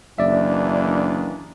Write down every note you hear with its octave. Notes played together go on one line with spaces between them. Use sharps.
F#1 D#2 E3 D4 D5 E5